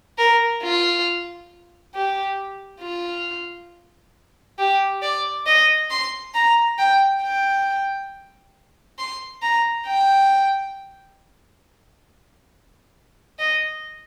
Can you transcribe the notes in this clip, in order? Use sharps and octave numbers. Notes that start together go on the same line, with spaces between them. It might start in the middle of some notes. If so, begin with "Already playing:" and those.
A#4
F4
G4
F4
G4
D5
D#5
C6
A#5
G5
G5
C6
A#5
G5
D#5